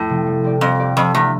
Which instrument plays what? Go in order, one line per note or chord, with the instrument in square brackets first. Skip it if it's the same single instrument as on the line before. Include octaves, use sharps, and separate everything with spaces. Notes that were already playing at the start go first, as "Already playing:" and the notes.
Already playing: [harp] F2 [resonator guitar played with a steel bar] A2
[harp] C3 F3 C4
G3
C4 G4 D5
[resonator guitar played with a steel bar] F2 [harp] G3
[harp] C4 G4 D5
[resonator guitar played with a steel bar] F2 [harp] F3
[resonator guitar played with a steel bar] E2 [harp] A3 D4